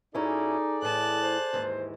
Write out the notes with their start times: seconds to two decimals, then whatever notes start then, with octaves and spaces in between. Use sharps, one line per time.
0.15 F#2 C#4 D#4 E4 G#4 A4 D5
0.82 A2 E3 A5 F#6
1.22 C5
1.53 D#2 G#2 E3